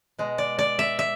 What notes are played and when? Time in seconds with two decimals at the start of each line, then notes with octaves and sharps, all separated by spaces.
0.18 B2 G#3
0.38 D5
0.59 D5
0.79 E5
0.99 E5